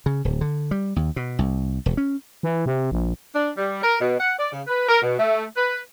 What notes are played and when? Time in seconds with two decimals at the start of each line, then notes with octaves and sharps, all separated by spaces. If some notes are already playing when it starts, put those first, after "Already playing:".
0.06 C#3
0.25 D1
0.41 D3
0.71 G3
0.96 D#2
1.16 B2
1.39 C2
1.86 E1
1.97 C#4
2.43 E3
2.66 C3
2.92 A#1
3.33 D4
3.55 G3
3.82 A#4
4.00 B2
4.18 F#5
4.38 D5
4.52 C#3
4.67 B4
4.88 A#4
5.02 B2
5.18 A3
5.56 B4